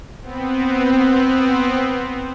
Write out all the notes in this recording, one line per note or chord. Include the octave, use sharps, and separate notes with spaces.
B3 C4